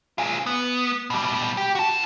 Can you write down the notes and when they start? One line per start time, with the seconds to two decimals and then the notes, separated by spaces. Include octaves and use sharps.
0.18 F4 G#4
0.46 B3
1.10 B2 G3
1.57 G4
1.75 F#4 A5